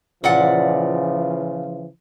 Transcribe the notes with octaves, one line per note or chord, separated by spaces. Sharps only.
A#2 C#3 E3 F3 D5 F#5